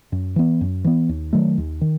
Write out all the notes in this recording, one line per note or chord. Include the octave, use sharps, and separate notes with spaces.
F#2
E3 B3
F#2
E3 B3
D#2
D#3 F#3 A3
D#2
D#3